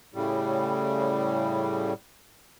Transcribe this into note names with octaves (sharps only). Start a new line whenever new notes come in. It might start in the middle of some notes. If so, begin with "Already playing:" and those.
A2 C#3 G3